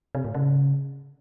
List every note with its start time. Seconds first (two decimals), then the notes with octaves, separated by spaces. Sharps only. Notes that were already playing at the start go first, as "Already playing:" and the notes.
0.15 C3
0.25 A2
0.35 C#3